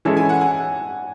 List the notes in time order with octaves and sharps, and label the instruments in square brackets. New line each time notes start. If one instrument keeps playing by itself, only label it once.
[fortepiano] E3 G#3 C#4 E4 A4 [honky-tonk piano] A5
[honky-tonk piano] G#5
F#5
G#5